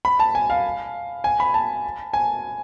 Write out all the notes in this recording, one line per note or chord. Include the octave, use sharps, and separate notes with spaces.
B5
A5
G#5
F5
G#5
B5
A5
G#5